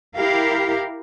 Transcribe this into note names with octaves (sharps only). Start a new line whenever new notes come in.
E4 G4 A#4 F5